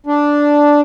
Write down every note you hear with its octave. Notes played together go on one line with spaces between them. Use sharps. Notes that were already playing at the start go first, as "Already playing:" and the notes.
D4